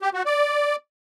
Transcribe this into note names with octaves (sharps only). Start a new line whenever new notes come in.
G4
F#4
D5